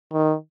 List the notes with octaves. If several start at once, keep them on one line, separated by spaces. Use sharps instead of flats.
D#3